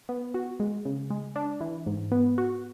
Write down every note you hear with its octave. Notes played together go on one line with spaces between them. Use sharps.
B3
F#4
G#3
C#3
G#3
D4
E3
G#2
B3
F#4